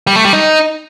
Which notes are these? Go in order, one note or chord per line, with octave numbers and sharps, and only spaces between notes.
G3
A3
G3
D#4